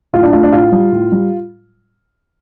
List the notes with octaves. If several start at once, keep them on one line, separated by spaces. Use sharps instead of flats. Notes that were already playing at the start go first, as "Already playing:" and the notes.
A2 F4
D4
A3 F4
D4
A2 F4
G3
A2
G3